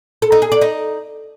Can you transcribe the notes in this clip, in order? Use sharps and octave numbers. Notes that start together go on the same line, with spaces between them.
A4
D#4
G#4
D5
D#4